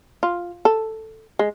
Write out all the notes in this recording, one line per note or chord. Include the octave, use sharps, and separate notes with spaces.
F4
A4
G#3